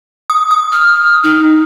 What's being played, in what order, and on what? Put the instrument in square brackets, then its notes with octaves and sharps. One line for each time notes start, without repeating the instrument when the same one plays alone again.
[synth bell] D#6
D#6
[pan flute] F6
D#4